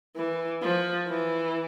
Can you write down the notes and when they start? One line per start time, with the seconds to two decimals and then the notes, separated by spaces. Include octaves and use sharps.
0.16 E3
0.62 F3
1.08 E3